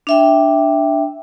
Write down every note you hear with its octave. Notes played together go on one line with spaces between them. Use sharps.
D4 E5 G5